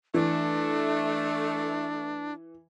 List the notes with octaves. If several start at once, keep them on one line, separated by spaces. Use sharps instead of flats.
E3 A3 D4